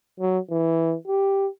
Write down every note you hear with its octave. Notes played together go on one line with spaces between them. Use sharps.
F#3
E3
G4